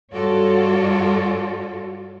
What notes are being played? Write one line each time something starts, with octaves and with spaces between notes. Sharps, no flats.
G2 F4 F#4 A4 C#5 D5